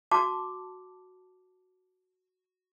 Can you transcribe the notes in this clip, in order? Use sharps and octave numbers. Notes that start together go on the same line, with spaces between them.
F#4 A5 D6